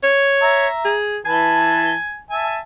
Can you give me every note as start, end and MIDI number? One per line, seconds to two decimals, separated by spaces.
0.03 0.68 73
0.42 0.93 76
0.42 0.93 82
0.85 1.20 68
1.25 1.93 52
1.25 1.93 71
1.25 2.20 80
1.25 1.93 81
2.30 2.59 76
2.30 2.59 80
2.30 2.59 81